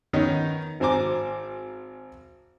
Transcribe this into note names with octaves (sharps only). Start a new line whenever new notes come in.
D#3 B3 C#4 D#4
G#1 C4 C5 G#5 A#5 D6